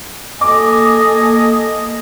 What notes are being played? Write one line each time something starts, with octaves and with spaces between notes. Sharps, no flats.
A#3 A4 D#5 G#5 D6